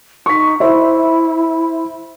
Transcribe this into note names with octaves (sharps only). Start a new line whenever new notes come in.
D#4 C#6 B6
E4 C5 E5